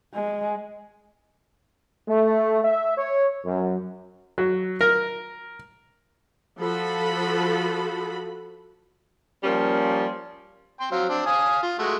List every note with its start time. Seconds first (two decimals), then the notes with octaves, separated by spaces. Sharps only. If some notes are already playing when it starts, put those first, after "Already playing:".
0.14 G#3
2.08 A3
2.65 E5
2.98 C#5
3.45 F#2
4.38 F#3
4.81 A#4
6.60 F3 F#4 A4 B5
9.44 F3 G3 A#3 C#4
10.80 G5 C6
10.92 F#3 C4 F5
11.09 C4 D4
11.26 F5 G#5 D#6
11.63 F4
11.79 G#3 A3 F#4